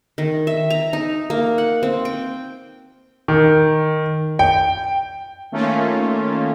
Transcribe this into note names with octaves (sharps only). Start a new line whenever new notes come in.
D#3
E5
A#5
D#4
A#3
F#5
C4
G5
D#3
G5
D#3 A3 A#3 C#4 F4